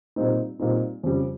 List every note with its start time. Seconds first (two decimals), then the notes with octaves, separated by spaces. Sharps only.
0.16 A#2 G3 C4 D#4
0.60 A#2 G3 C4 D#4
1.03 F2 C#3 G3